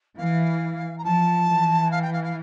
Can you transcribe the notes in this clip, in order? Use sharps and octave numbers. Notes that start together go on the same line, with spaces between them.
E3 F5
A#5
F3 A5
E3
F5
G5
F5
F5